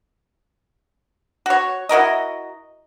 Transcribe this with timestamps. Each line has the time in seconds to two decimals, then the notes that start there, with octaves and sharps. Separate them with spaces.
1.46 F#4 C#5
1.89 E4 F#4 A#4 D#5